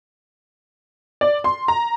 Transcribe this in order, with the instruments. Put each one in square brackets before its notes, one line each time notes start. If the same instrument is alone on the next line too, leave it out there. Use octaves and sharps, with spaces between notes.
[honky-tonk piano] D5
C6
A#5